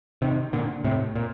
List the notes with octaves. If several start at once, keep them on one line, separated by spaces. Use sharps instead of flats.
C3 D#3
A#2 D3
A2 C3
A#2